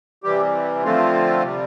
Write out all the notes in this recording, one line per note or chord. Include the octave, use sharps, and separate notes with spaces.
C3 E3 G3 G4
D3 F3 A3 C4 F4
C3 G3